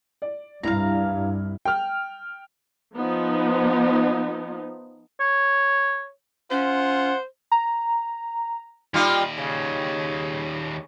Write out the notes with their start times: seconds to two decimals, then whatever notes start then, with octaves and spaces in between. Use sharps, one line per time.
0.22 D5
0.63 C2 G2 E4 F5 A#5 F6
1.65 G5 F6
2.96 F3 B3 D#4
5.20 C#5
6.51 C#4 F4 C5 F#5
7.52 A#5
8.94 D#2 G3 D#4 F4 D5
9.38 C#3